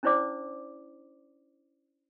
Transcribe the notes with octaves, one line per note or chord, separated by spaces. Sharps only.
C#4 D4 E4 C5 D5 D6